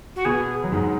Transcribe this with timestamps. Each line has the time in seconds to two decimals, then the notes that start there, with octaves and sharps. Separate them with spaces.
0.16 F#4
0.25 B2 B3 G#4
0.64 F#3
0.72 G#2 G#3